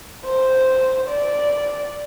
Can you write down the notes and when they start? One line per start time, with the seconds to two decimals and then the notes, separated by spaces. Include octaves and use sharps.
0.25 C5
1.09 D5